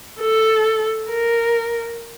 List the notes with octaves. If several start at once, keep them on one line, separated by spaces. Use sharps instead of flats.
A4
A#4